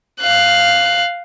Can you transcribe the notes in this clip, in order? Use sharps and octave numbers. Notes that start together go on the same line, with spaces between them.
F5 F#6